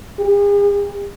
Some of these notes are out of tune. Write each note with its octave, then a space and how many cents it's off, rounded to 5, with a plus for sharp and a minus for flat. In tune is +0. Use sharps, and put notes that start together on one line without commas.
G#4 -45